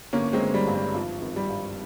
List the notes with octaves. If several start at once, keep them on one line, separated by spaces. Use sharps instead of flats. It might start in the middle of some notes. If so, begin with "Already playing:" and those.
G1 A#3 C#4
G#3 C4
G1
G3
G2
G3
G#1 F3
G#1
G3
G2